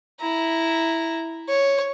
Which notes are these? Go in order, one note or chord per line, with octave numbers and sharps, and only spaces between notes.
E4 A#5
C#5